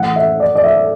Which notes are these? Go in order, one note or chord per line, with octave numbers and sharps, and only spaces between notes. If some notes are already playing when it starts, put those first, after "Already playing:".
Already playing: A2 E3 F#5
E5
D5
D5
E5